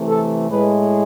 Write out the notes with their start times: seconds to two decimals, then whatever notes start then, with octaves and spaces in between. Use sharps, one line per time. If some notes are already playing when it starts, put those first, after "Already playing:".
Already playing: C3 E3 A3
0.08 A4
0.49 A2 G#3 B4